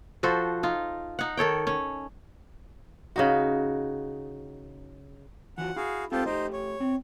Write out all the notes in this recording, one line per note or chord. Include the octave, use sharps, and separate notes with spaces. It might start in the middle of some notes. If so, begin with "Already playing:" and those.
F3 F#4 A4 C5
D#4 F4
D#4 F#5
D#3 A4 C#5 G5
C#4
C#3 D#4 F#4
E3 F4 F#4 F#5
E4 F#4 G#4 F5
C4 F4 G4 A4 A#4 C5
A3 D#4 G4 C5
C#5
C4